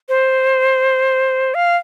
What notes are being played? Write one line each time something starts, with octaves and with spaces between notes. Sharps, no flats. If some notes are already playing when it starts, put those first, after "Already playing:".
C5
F5